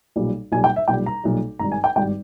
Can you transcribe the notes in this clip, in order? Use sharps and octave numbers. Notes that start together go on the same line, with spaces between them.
B1 A#2 G3
B1 A#2 G3 G#5
G5
E5
B1 A#2 G3 G5
A#5
B1 A#2 G3
G#1 G2 G3 A#5
G#5
G5
G#1 G2 G3 G5